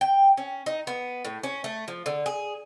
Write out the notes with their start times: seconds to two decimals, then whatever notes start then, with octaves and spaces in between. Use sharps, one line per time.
0.01 G5
0.38 C#4
0.66 D#4
0.87 B3
1.25 A2
1.43 C#4
1.64 A3
1.88 F3
2.06 D3
2.26 G#4